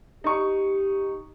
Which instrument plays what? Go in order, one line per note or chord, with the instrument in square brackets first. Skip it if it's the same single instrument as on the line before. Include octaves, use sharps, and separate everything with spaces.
[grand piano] D#4 C#6 [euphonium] G4